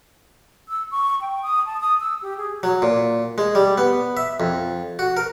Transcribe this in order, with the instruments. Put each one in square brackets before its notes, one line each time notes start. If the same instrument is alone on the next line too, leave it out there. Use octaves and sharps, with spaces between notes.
[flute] E6
C#6
G5
D#6
A5
D#6
E6
G4
G#4
[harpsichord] F#3
A#2
G#3
G3
B3
E5
F2
F#4
A#4